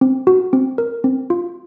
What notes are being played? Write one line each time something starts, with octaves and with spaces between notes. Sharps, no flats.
C4
F#4
C4
A#4
C4
F4